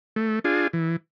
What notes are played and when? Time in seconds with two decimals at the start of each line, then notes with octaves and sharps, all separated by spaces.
0.16 A3
0.44 D4 F4 G#4
0.73 E3